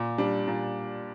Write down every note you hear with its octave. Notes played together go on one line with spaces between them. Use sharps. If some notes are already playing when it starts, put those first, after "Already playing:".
Already playing: A#2
G3 D4
A#2